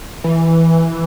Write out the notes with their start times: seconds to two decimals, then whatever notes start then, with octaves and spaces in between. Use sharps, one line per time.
0.24 E3